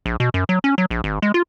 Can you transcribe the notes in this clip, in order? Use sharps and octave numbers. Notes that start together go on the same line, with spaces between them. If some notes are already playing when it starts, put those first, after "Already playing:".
A#1
B2
F#2
F#3
C#4
F#3
A#1
G#1
G#3
F4